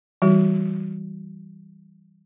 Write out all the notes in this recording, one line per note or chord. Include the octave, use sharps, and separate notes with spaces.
E3 G3 F#4